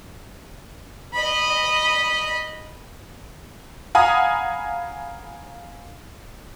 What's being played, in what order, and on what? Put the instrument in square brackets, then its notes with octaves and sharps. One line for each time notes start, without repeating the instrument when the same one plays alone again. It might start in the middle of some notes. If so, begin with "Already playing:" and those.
[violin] D#5 B5
[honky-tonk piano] F5 F#5 G#5 A#5 B5 D#6